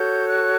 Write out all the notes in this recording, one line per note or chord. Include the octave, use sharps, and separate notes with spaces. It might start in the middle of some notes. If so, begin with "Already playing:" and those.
Already playing: F#4 A4 C#5 G6
F#6